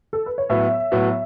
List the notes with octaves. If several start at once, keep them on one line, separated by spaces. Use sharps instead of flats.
A4
B4
C#5
A2 F#3 B3 E5
A2 F#3 B3